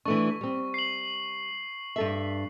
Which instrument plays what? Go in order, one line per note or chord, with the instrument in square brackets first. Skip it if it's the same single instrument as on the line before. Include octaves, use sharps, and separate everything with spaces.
[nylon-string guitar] E3 A3 D4 [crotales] C#6
[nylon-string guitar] G3 C4
[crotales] C7 F#7
[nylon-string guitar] G2 A4 E5